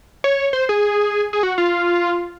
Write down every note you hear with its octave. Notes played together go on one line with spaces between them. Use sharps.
C#5
C5
G#4
G#4
F#4
F4